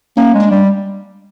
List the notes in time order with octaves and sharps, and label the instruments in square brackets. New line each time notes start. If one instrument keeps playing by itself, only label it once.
[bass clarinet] A#3 [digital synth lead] C#4
[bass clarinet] G#3
[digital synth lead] D4
[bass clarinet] G3